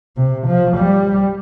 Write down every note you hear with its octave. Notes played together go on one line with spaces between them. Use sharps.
C3
F3
G3